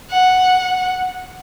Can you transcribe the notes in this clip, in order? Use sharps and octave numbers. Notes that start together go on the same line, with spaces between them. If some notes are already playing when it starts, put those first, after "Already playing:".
F#5